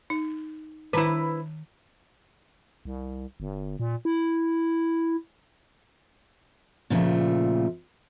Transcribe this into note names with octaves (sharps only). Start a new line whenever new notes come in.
D#4
D#3 E4 B4 A5 A#5
C2
G1
A#2
E4
A#2 C#3 F3 A3